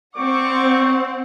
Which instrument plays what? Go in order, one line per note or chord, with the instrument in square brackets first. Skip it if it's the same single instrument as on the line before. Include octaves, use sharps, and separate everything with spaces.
[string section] C4 F#5 [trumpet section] D5 C#6 D6